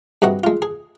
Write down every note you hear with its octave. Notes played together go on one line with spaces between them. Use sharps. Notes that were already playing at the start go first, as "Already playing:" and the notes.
G2 C3 F#4 D#5 F#5
G#3 F4
G#4